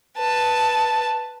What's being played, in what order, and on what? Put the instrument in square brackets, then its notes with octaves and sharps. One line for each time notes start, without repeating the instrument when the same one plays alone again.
[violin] B4 A5